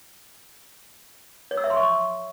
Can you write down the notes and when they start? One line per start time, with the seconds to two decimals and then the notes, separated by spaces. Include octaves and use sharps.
1.51 C#5
1.57 E6
1.64 E5
1.70 C6
1.77 C#6